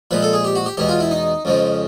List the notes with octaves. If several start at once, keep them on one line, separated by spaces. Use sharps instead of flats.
A#2 F3 G#3 B4
A4
G#4
G4
F#4
G4
E2 B2 G#3 G4
F4
E4
D#4
F2 C#3 F3 G#3